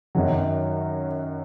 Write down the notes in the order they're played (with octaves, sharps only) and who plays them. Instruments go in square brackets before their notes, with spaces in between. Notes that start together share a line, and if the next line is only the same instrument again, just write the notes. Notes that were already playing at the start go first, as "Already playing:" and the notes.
[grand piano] F#2 D#3 F#3